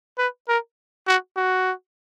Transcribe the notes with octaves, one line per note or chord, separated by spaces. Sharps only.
B4
A#4
F#4
F#4